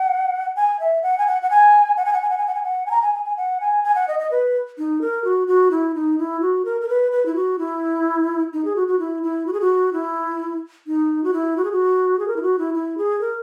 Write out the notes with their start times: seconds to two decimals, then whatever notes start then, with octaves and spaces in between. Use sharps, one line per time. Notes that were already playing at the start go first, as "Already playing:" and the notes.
Already playing: F#5
0.56 G#5
0.80 E5
1.03 F#5
1.18 G#5
1.27 F#5
1.42 F#5
1.50 G#5
1.97 F#5
2.05 G#5
2.13 F#5
2.22 G#5
2.30 F#5
2.38 G#5
2.47 F#5
2.55 G#5
2.63 F#5
2.86 G#5
2.91 A#5
3.02 G#5
3.15 G#5
3.25 G#5
3.37 F#5
3.61 G#5
3.84 G#5
3.95 F#5
4.08 D#5
4.19 D#5
4.31 B4
4.78 D#4
5.01 A#4
5.24 F#4
5.48 F#4
5.71 E4
5.95 D#4
6.19 E4
6.42 F#4
6.65 A#4
6.81 A#4
6.89 B4
7.12 B4
7.26 E4
7.36 F#4
7.59 E4
8.53 D#4
8.65 G#4
8.76 F#4
8.88 F#4
8.99 E4
9.23 E4
9.47 F#4
9.53 G#4
9.61 F#4
9.93 E4
10.87 D#4
11.24 F#4
11.33 E4
11.57 F#4
11.65 G#4
11.72 F#4
12.19 G#4
12.28 A#4
12.36 E4
12.42 F#4
12.59 E4
12.74 E4
12.98 G#4
13.21 A#4